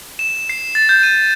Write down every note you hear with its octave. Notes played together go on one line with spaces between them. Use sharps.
E7
C7
A6
G6
D#7